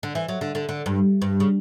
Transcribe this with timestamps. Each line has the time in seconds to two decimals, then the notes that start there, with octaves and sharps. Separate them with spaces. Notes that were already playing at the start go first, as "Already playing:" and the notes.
0.03 D3
0.15 E3
0.28 F#3
0.41 D3
0.55 D3
0.69 D3
0.86 G2
1.22 G2
1.40 C#3